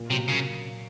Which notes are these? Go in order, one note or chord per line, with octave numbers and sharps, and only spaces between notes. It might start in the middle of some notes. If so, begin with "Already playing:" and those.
Already playing: A#2
C3 F#3 A#3
A#2 C#3